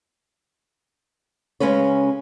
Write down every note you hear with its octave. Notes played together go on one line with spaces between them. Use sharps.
C#3 G#3 C#4 B4 C#5